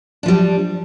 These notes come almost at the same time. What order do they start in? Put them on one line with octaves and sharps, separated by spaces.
D4 F3 G3